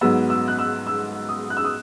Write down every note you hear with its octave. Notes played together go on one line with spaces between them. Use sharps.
G#2 F#3 B3 E6
E6
F#6
E6
E6
D#6
F#6
E6
D#6